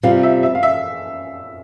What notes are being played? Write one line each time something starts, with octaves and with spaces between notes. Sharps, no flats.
C3 G3 C4 F4 F5
E5
E5
F5
E5